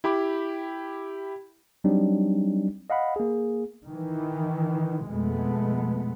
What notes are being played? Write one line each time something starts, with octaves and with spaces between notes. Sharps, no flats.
E4 G4 B5 D6
F#3 G3 C4 D4 D#4
D#5 F5 F#5 B5
A#3 G#4
D#3 E3
F2 B2 G#3 A3 B3